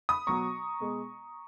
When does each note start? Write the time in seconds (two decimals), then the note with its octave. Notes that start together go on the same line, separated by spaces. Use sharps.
0.09 B5 D#6
0.27 B2 F#3 A#5 C#6
0.80 B2 G#3